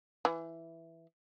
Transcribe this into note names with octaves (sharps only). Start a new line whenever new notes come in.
E3